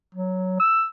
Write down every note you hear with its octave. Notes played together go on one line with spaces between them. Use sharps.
F#3
E6